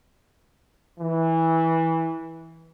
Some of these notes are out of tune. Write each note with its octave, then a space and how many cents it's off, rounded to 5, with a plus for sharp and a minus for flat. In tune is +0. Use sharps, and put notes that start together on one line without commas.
E3 -15